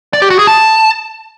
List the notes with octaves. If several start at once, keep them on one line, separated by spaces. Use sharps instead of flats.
D5
G4
F#4
G#4
A5